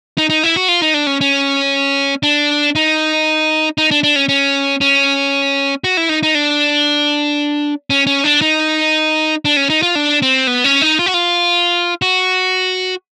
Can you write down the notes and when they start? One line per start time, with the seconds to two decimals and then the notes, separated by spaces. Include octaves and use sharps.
0.18 D#4
0.30 D#4
0.43 E4
0.56 F#4
0.68 F4
0.82 D#4
0.94 D4
1.07 C#4
1.21 C#4
2.23 D4
2.75 D#4
3.78 D#4
3.91 D4
4.03 D4
4.16 C#4
4.29 C#4
4.81 C#4
5.84 F#4
5.97 E4
6.09 D#4
6.23 D#4
6.35 D4
7.90 C#4
8.07 C#4
8.24 D4
8.41 D#4
9.45 D4
9.57 C#4
9.70 D#4
9.82 F4
9.95 D4
10.22 C4
10.47 B3
10.64 C#4
10.82 D#4
10.99 F4
11.06 F#4
11.14 F4
12.02 F#4